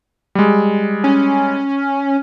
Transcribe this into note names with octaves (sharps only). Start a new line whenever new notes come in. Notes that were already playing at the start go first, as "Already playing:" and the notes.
G3 G#3
C#4